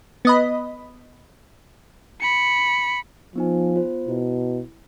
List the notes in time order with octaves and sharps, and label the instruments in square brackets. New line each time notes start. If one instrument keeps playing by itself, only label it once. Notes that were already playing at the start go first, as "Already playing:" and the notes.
[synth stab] B3 D#5 B5
[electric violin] B5 C#7
[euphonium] F3 [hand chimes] B3 D#4 G#5
[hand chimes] B3 F4 C5
[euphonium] B2 [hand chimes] E4